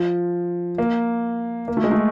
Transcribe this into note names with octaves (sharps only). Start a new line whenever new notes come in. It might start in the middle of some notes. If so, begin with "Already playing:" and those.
Already playing: F3
A#3
A#3
A3
G#3
A3